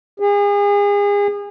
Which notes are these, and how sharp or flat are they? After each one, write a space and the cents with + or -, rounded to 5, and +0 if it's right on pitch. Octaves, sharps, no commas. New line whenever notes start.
G#4 -35